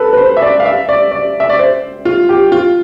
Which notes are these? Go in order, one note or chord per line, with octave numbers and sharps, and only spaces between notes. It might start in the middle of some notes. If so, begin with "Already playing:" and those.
Already playing: A4 B4
B4
C5
E5
D5
F5
E5
D5
D5
E5
D5
C5
F4
G4
F4